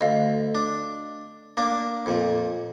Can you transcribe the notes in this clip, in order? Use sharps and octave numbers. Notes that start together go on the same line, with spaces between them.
D2 D#5 F5
D4
A#3 D4
F2 A#2